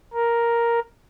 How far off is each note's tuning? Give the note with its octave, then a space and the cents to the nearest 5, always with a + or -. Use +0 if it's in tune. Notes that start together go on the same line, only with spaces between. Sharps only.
A#4 +5